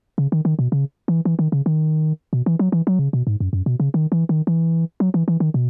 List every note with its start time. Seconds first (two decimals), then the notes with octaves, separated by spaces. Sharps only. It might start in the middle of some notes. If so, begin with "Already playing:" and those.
0.18 C#3
0.32 D#3
0.45 D#3
0.59 B2
0.72 C#3
1.08 E3
1.25 E3
1.39 D#3
1.52 C#3
1.66 D#3
2.33 B2
2.46 E3
2.59 F#3
2.72 E3
2.87 F#3
2.99 C#3
3.13 B2
3.27 G#2
3.40 F#2
3.53 F#2
3.66 B2
3.80 C#3
3.94 D#3
4.12 E3
4.29 D#3
4.47 E3
5.00 F#3
5.14 E3
5.28 E3
5.40 D#3
5.54 B2